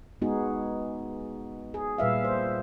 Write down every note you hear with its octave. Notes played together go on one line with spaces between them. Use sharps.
G#3 B3 D#4 F#4 G#4
G#4
A#2 G3 B4 E5 F5
C5